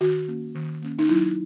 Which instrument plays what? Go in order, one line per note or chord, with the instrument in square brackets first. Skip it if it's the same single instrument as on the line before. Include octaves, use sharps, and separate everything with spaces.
[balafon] D#3 F#4
A#3 C#4
D#3
A#3 C#4
D#4
F#3 E4